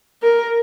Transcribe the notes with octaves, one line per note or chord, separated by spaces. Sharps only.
A#4